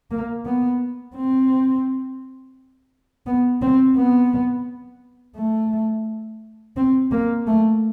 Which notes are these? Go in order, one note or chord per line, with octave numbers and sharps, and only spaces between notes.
A#3
B3
C4
B3
C4
B3
A3
C4
A#3
A3